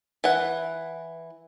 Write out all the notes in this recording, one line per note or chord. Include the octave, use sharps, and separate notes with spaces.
E3 F#5